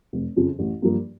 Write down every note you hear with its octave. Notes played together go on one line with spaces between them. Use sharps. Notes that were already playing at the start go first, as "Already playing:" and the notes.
F1
F2 C#3 F3
A1
G2 F3 A#3